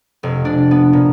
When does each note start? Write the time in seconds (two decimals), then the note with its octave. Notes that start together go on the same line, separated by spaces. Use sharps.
0.23 F1
0.45 D4
0.71 B3
0.93 A#2